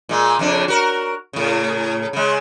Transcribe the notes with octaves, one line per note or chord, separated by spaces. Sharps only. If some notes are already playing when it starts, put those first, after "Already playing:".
A#2 G#3
F2 C#3 D4
F#4 A#4
A2 C#3
C#3 G#3